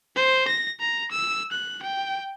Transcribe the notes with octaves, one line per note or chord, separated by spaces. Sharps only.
C5
A#6
A#5
E6
F#6
G5